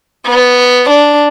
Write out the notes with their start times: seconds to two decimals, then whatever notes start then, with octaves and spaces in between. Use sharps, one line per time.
0.26 B3
0.90 D4